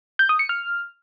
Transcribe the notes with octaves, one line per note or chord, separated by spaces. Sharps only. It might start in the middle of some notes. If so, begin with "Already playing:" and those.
G6
D#6
C#7
F6